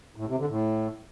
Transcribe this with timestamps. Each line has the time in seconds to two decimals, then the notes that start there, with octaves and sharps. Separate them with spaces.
0.16 A2
0.27 C3
0.38 D3
0.49 A2